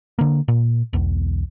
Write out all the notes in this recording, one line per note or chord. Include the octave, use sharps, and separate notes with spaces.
D3 A#3
A#2
B1 E2